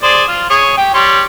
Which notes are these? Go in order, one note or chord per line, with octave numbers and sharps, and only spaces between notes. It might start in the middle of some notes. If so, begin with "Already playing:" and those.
G#4 C5 D5
F4
G#4 C#5
G4 G5
G3 C#5 C6